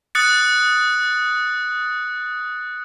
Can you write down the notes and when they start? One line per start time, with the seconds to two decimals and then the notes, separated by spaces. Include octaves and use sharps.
0.15 D#6 F#6 A6 C#7